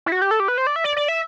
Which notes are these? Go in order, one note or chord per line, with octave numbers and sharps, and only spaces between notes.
E4
F#4
G4
A4
G4
B4
C5
D5
E5
D5
D5
E5